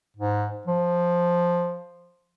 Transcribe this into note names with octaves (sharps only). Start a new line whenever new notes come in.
G#2
F3